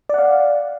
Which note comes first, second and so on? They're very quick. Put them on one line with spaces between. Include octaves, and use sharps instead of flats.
D5 F#5 F5